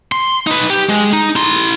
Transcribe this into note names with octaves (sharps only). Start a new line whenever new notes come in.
C6
D#4 B4
G4
G#3
D#4
E4 C6